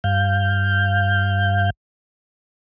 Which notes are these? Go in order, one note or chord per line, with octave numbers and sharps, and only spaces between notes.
G2 F5 G6